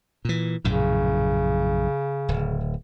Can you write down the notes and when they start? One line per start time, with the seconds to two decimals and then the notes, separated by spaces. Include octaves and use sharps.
0.25 A#2 E3
0.65 A#1 F#2 A2 C#3
2.28 D1